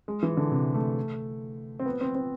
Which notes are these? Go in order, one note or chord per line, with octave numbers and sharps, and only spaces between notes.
G#3
E3
D3
C3
A3
C4
B3
C4
C4